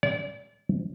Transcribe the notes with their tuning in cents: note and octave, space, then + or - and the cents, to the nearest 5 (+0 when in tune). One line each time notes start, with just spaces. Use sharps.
D5 -35